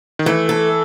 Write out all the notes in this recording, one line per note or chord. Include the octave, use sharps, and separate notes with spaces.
D#3
E3 A3
A4